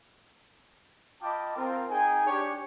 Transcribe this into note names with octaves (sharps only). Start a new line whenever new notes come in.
F4 D#5 G5 A5 B5 D6
C4 F4 A#4
D#4 G#4 G5 G#5
D4 G4 C#5